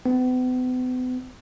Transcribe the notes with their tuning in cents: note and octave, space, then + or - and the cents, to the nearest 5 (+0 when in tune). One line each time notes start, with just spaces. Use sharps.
B3 +40